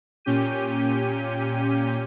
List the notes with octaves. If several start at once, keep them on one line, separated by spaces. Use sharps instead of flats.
A#2 C#4 G4 G6 D#7